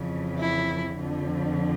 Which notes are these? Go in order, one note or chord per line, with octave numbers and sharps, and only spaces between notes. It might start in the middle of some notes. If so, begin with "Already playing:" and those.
Already playing: F2 C#3 E3
E4
F2 D3 F3